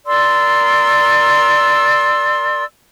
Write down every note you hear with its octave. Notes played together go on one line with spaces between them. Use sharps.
A#4 D5 C6 E6